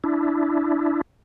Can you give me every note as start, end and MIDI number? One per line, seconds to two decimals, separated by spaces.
0.04 1.01 62
0.04 1.01 64